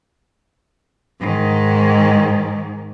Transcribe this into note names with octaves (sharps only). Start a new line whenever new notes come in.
G#2 D#3